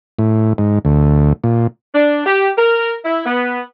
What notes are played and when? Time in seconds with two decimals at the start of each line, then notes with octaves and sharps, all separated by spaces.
0.19 A2
0.58 G#2
0.85 D2
1.44 A#2
1.95 D4
2.26 G4
2.57 A#4
3.04 E4
3.26 B3